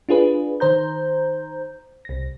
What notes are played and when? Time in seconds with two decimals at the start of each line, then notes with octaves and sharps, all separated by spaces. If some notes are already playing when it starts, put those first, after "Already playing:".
0.09 D4 F4 G#4 B4
0.60 D#3 C5 A#5 G6
2.05 C2 A#6